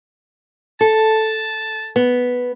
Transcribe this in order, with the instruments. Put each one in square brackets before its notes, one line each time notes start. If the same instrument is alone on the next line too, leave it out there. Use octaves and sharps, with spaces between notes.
[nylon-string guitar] A4 [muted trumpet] A5
[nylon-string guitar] B3